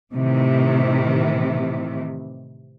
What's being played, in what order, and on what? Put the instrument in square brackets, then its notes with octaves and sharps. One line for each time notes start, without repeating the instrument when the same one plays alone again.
[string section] A2 C3 D#3 E3